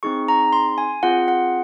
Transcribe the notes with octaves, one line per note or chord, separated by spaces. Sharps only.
C4 D#4 G#4 C#6
A#5
C6
G#5
C4 F4 G#4 F#5
F#5